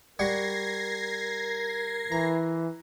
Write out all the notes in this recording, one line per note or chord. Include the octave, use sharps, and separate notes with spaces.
G3 A#4 F#5 C#6 G#6 A#6 C7
E3 A#5